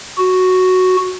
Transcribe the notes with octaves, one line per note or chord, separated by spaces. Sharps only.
F#4